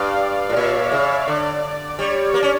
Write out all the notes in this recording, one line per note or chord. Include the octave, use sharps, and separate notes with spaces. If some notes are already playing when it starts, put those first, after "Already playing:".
Already playing: G2 D5 F5
A2
A#2 C#5 E5
C#3
D3 D5
G3 C#5
A#3
C#4